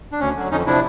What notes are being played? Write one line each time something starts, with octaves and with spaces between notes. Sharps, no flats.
D4
D2 C#4
D3 F#3
F2 C#4 D#4
C3 F3 D4 E4